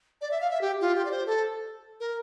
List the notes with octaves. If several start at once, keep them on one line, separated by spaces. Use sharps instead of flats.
D5
E5
F5
E5
G4
F4
G4
D5
C5
A4
A#4